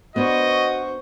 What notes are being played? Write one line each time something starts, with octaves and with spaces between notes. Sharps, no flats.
B3 D4 F#4 B4 C5 D#5 C#6